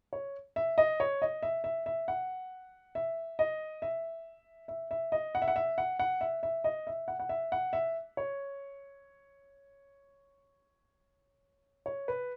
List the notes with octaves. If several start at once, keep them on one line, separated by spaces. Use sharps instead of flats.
C#5
E5
D#5
C#5
D#5
E5
E5
E5
F#5
E5
D#5
E5
E5
E5
D#5
F#5
E5
F#5
E5
F#5
F#5
E5
E5
D#5
E5
F#5
F#5
E5
F#5
E5
C#5
C#5
B4